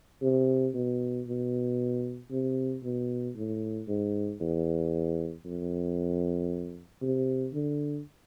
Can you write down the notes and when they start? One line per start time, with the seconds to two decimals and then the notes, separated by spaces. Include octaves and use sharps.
0.22 C3
0.75 B2
1.27 B2
2.31 C3
2.83 B2
3.36 A2
3.88 G#2
4.41 E2
5.45 F2
7.02 C3
7.54 D3